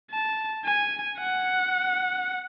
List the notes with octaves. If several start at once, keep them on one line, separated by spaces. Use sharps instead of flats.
A5
G#5
F#5